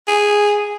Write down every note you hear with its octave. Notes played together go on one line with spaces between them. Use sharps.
G#4